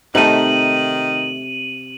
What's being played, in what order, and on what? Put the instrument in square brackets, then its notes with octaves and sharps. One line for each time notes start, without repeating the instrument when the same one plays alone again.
[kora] C3 [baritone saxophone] D#3 [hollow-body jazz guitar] A3 D#4 [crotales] D#7 F#7